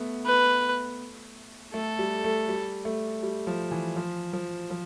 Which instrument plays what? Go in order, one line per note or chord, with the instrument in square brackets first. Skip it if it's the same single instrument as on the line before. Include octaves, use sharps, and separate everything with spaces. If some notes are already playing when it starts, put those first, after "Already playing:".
Already playing: [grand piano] A3 B3
[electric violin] B4
[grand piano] A3 [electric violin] A4
[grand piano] G3
A3
G3
A3
G3
F3
E3
F3
F3
F3